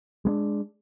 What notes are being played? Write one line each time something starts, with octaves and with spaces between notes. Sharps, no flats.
G#3 A#3 D4